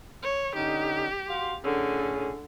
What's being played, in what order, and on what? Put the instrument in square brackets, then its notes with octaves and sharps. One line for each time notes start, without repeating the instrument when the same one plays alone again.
[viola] C#5
[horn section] D3 C#4 D#4 [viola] G4
[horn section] F#4 F5 C6
[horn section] A2 C#4 G#4 [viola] D3